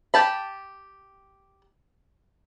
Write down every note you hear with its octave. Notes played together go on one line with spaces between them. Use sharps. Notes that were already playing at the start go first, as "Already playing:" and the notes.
G4 G5 A5 B5